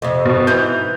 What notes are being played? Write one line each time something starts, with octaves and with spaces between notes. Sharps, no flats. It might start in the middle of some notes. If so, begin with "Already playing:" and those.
F2 C3
B2
G#2 E3 D#4 G6